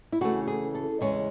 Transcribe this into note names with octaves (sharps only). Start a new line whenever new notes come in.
E4
C#3 E3 A3 F#4
G#4
A4
E2 C#3 G#3 C#4 C#5